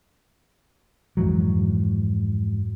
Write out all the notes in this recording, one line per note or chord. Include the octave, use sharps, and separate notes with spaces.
F2 G#2 E3 F#3